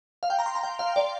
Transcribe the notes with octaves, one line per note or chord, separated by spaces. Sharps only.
F5
G5
A#5
C6
A#5
G5
F5
D5